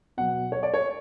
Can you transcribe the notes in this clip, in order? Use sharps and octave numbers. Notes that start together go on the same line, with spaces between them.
B2 F#3 F#5
C#5
D5
C#5